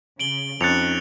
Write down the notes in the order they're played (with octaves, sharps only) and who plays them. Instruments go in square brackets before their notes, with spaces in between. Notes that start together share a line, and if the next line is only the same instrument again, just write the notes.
[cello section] C#3 [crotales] D7 F#7 G7
[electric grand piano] F2 A6 [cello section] C#4 D#4 [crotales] F#6 C#7 F7